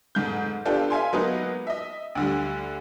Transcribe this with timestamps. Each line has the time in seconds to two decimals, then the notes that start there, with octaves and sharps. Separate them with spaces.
0.15 F1 G#2 G6
0.65 B3 D4 F4 G4 A4
0.90 E5 F5 G#5 C6
1.13 F#3 G#3 A#3 B3 D#4 F#4
1.67 D#5 E5
2.15 D2 D3 G3